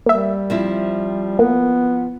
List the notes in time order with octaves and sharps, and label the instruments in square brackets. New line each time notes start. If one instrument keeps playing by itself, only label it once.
[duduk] G3 [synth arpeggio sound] A#3 E5
[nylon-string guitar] F3 C4 E4
[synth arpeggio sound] A#3 [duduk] B3